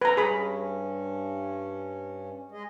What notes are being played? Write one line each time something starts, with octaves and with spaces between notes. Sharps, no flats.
G2 C#4 B4 A#5
G#4 B5
G#3 G#4 D#5